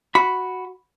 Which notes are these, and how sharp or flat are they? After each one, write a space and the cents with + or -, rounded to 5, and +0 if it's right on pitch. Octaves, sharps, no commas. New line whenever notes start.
F#4 +0 B5 +0